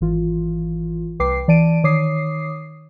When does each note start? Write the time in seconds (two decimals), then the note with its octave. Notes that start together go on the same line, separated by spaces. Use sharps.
0.01 G#1 E3 F4
1.19 C2 B4 G5 D6 C7
1.48 E3 D5 A5 D7 D#7
1.84 D#3 C#5 D6 D#6 C7